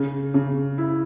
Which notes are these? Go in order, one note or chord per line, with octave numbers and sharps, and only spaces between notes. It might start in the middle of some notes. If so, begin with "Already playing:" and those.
Already playing: C#3
C#3
E4